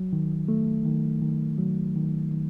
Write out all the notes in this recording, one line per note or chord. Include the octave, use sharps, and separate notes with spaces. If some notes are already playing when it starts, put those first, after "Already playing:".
Already playing: F#3
D#3
A3
D#3
D#3
F#3
D#3
D#3